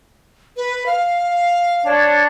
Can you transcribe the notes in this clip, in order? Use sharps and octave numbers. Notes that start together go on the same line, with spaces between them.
B4
F5
D4 C#5